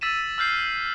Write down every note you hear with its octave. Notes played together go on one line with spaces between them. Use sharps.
E6 A6 B6 D#7 E7
E6 F6 G6 C7